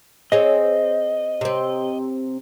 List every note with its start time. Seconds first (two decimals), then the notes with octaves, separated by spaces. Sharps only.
0.32 C4 G#4 C#5 D#5
1.41 C3 C4